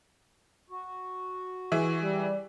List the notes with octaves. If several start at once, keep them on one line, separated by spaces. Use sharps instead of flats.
F#4
E3 G#4 E5
G3